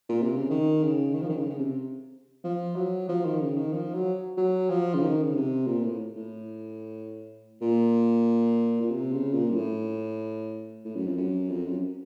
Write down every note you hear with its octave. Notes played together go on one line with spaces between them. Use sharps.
A#2
C3
C#3
D#3
C#3
D#3
F3
D#3
C#3
C#3
C3
F3
F#3
F3
D#3
C#3
D#3
F3
F#3
F#3
F3
C#3
D#3
C#3
C3
A#2
A2
A2
A#2
A#2
C3
C#3
A#2
F#2
A2
A2
F#2
F2
F#2
F2
F#2